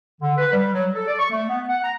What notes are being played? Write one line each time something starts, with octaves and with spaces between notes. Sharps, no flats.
D3
B4
G3
F#3
A4
D5
C#6
A3
B3
F#5
A#5